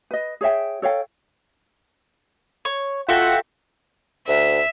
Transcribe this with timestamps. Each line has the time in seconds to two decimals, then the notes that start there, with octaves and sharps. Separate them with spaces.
0.11 B4 D#5
0.41 G#4 C#5 E5 G5
0.82 A4 C#5 F5 G5
2.65 C#5
3.09 F4 F#4 A4 E5 F#5 G5
4.28 D2 E5